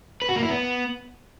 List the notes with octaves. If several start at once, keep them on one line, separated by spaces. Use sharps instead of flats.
B4
F#4
A#3
E4
B3